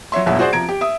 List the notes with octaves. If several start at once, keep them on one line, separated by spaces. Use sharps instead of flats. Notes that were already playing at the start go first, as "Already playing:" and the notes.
F#3 C#5 E5 C6
G1 E2 B2 F#3 E5
F#4 G#4 C5 D5 F#5
C3 F3 A#5 G#6 D7
G4
E5 D#6